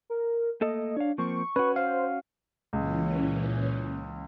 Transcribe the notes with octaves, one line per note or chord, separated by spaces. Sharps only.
A#4
A3 A#3 A4 D#5
D4 C#5 F5
F3 A#3 C4 C#6
C#4 F#4 B4
C5 F5
C#2 A#2 E3 C#4